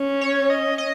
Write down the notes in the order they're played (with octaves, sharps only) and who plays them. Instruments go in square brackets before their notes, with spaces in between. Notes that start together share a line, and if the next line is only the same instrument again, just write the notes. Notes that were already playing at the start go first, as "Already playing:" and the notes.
Already playing: [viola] C#4
[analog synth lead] C#5
D#5
D#5